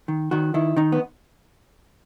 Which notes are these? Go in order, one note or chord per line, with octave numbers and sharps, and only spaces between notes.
D#3
D#3 F#4
D#3 E4
D#3 D#4
B3